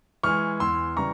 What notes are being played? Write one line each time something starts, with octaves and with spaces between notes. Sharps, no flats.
E3 G#3 C#6 F6
E2 C6 E6
C#3 E3 G3 A#5 C#6